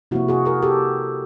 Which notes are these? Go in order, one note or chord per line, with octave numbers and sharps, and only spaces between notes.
C3 F3 A#3 E4 F#4
F#4 G#4
G#4 A#4
G4 A4